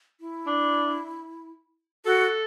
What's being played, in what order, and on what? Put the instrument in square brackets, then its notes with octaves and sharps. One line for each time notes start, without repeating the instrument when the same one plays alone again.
[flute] E4
[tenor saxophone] D4
[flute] F#4 [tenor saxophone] A4